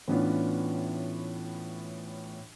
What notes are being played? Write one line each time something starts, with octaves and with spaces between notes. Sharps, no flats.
A2 E3 B3 C#4 D4 F4